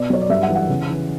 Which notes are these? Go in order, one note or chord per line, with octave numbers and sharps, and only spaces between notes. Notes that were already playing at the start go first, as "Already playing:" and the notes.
Already playing: B2 D5
F#3 C#5
D5
G2 E5
F#5
E3
F#5
C#3
E3